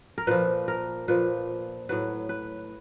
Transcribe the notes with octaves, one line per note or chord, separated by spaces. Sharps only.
A#4
A#2 F3 B4
A#4
A#2 F3 B4
A2 F#3 B4
B4